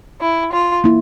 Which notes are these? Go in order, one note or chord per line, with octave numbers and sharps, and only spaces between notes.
E4
F4
A#3 E4